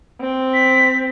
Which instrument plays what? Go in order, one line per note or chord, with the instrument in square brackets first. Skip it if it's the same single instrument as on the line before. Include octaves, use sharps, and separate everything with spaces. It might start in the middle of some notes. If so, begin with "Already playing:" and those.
[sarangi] C4
[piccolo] B6